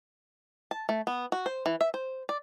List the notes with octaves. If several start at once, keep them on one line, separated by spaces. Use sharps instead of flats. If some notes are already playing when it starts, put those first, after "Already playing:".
A5
A3
B3
F#4
C5
E3
E5
C5
D5